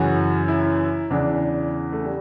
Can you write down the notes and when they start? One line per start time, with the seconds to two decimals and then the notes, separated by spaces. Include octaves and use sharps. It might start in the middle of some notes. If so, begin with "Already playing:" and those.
Already playing: F#2 C#3 E3 F#4
0.48 E4
1.10 E2 C#3 E3 D4
1.92 A3
2.04 G3